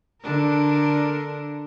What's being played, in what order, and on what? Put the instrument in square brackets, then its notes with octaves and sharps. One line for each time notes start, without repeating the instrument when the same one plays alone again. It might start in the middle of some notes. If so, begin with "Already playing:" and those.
[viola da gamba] D3 D4 A#4